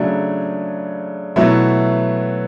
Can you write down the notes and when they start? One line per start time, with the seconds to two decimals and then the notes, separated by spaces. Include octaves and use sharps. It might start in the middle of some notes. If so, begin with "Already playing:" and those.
Already playing: C#3 F#3 A3 D4
1.36 B2 F#3 A3 E4